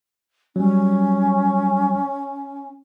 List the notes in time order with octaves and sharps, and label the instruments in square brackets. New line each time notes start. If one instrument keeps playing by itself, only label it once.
[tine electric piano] F#3 G3 [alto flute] C#4